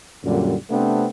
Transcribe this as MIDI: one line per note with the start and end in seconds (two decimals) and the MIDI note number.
0.23 0.55 42
0.23 0.55 46
0.23 0.55 50
0.23 0.55 55
0.70 1.06 48
0.70 1.06 57
0.70 1.06 59
0.70 1.06 60
0.70 1.06 62